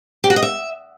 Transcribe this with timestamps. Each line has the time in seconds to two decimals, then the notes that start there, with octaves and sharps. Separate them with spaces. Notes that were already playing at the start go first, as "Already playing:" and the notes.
0.24 G4
0.30 F#4
0.36 D#5
0.43 E5